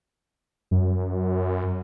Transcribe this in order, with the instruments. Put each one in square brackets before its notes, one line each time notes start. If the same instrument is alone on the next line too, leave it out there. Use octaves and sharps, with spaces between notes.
[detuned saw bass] F#2